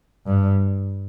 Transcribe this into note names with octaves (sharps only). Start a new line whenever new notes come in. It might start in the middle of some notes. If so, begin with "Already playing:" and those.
G2